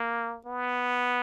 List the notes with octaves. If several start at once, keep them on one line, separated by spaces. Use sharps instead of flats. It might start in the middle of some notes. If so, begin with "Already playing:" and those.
Already playing: A#3
B3